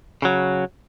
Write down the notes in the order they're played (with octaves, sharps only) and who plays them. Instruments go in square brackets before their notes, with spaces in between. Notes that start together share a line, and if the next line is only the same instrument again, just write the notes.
[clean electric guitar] C#3 F#3